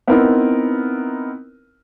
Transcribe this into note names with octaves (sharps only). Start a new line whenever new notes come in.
B3 C4 D#4 E4 A#4 B4